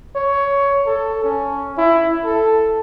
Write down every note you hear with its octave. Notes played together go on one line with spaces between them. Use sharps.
C#5
A4
C#4
E4
A4